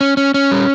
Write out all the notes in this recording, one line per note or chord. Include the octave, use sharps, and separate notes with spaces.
C#4
C#4
C#4
G3